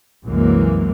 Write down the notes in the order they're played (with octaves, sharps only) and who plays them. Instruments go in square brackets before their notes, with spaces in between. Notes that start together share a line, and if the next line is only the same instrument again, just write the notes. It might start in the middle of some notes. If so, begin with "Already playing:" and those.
[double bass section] C2 F#2 E3 F#3 G#3 A#3